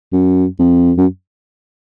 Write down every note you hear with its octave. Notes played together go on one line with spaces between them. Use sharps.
F#2
F2
F#2